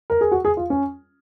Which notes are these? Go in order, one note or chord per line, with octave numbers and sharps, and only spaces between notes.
A#4
G#4
F#4
G#4
F4
C#4